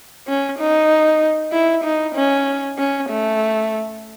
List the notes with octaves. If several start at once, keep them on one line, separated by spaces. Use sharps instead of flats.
C#4
D#4
E4
D#4
C#4
C#4
A3